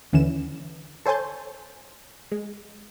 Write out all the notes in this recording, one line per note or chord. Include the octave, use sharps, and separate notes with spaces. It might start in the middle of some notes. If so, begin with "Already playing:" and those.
D#2 D3 E3 C#4 E7
A4 C5 C#5 G#5 A5 G6
G#3